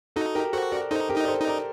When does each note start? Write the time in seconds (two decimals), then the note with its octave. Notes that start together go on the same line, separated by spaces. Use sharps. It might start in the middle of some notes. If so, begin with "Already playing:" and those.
0.16 D#4 F#4 A4
0.35 G4 A#4
0.53 F#4 A4 C5
0.72 A#4 D5
0.91 D#4 A4 C5
1.09 G4 A#4
1.16 D#4
1.24 D5
1.28 A4 C5
1.40 D#4
1.47 A#4 D5